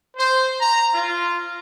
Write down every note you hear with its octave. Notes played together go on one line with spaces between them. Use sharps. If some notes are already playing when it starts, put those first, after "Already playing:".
C5
A#5
F4